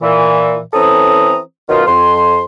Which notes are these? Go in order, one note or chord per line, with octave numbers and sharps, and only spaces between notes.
A#2 E3
E3 C4 C#4 A4 A#5 D#6
F#2 B2 D#3 F#3 D#4 F4
F2 C6